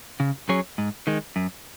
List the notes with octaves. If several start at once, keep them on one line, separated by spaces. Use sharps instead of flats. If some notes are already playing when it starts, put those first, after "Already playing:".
C#3
F#3 C#4 G#4 C#5
G#2
D#3 G#3
F#2